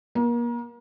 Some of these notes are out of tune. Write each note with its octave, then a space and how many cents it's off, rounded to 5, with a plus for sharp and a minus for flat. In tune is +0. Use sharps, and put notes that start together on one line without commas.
A#3 +35